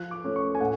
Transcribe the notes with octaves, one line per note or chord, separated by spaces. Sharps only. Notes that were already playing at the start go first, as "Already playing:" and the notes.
Already playing: F3 F#6
D6
A3 C#4
C#6
G#5
A2 F#5